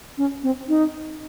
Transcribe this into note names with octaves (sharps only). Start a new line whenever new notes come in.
C#4
C4
D#4